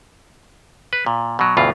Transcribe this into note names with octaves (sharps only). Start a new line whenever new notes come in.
B4
A#2
B2 F#3
D2 G2 B2 E3 F4